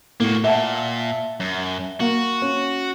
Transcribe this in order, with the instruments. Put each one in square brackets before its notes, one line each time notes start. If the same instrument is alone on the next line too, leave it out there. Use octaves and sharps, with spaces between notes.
[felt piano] A2 [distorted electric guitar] A#3 F#4
[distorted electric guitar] A#2 [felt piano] E5 F#5 A5
[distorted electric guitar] F#2
[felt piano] A#3 [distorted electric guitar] F#4
[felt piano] C#4